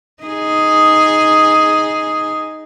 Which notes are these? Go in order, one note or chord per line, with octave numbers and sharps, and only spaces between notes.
D#4 G#4